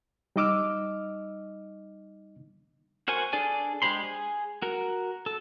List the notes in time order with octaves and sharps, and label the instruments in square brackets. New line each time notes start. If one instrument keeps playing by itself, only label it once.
[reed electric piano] G3 D#4 D#5 D6 E6 F6
[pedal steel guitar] F#4 A#4 C5 G#5 C#6
D4 G#4 A4 D5 G#5
G#3 G4 C5 B5 C6
G#4
F#4 A#4
A4